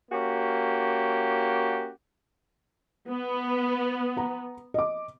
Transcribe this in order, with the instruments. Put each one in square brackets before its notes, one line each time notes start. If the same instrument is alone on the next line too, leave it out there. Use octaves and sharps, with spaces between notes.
[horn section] A#3 C#4 F#4 G4
[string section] B3
[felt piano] F#5 A#5
D#5 D6